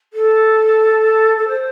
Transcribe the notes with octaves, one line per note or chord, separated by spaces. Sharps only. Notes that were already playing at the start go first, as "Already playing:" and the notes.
A4
A4
C5